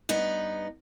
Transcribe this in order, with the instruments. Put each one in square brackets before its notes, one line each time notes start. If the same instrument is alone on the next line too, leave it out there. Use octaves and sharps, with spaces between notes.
[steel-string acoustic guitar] G2 B3 D#4